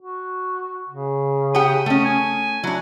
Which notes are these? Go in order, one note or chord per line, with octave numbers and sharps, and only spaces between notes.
F#4
C#3
G4 F#5 G5 D#6
A3 C#4
G#5
F#3 D4 E4